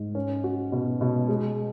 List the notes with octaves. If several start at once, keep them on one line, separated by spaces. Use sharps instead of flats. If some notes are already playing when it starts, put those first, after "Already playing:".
Already playing: G#2
C#4
F#4
B2
B2
G#3